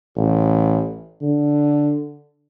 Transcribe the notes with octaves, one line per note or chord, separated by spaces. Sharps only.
A1
D3